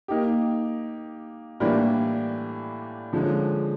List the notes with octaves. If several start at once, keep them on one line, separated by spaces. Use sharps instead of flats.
A#3 D#4 G4
A2 E3 G3 A#3 D4
D3 F3 G#3 C#4